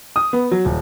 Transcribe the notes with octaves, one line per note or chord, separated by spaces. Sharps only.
D#6
B3
F#3
D#1